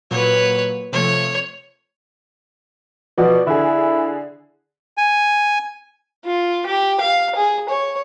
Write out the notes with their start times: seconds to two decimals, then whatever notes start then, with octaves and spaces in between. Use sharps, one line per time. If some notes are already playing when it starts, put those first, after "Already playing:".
0.11 A#2 F#3 B4 C#5
0.93 C3 F3 A3 C#5
3.18 B2 F3 D5 F#5
3.47 D3 E4 G#4
4.97 G#5
6.25 F4
6.66 G4
7.00 F5
7.35 G#4
7.69 C#5